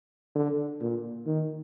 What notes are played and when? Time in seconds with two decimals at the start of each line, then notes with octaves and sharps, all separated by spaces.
0.36 D3
0.81 A#2
1.26 D#3